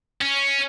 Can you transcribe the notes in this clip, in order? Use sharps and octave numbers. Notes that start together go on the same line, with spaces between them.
C#4